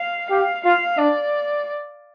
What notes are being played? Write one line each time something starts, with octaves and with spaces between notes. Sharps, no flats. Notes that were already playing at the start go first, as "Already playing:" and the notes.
Already playing: F5
G4 F5
F4 F5
D4 D5